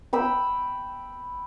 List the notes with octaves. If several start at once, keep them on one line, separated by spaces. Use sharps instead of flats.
G5 B5 E6